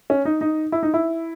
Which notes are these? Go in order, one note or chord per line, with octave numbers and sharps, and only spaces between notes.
C#4
D#4
D#4
E4
D#4
E4